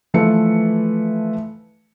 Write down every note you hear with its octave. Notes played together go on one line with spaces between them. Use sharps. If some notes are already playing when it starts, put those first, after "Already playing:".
E3 F3 A3 B4 E5 C#7